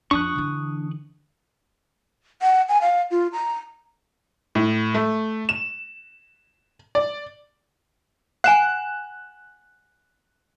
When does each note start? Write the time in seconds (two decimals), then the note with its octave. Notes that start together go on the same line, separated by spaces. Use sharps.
0.11 F2 F3 D4 C#6 D#6 F#6
0.36 D3 E3
2.42 F#5
2.69 G#5
2.82 F5
3.11 F4
3.33 A#5
4.55 A2
4.94 A3
5.49 E7
6.95 D5
8.44 F#5 G#5 F#6 E7